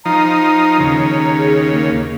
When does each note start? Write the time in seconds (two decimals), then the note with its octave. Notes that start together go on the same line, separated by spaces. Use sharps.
0.05 F3 D#4 A#5
0.79 D#2 C#3
1.37 G#4
1.72 A#3